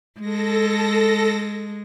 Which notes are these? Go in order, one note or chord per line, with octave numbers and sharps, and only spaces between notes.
G#3 A4 A#6